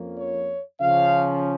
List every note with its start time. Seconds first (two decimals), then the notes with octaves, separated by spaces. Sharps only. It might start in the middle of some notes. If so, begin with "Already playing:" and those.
Already playing: F2 F3 A#3 C#4
0.17 C#5
0.81 C#3 F3 C#4 F5